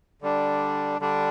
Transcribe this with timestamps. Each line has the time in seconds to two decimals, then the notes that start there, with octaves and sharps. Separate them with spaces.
0.22 D3 G3 D4
1.00 D3 G3 D4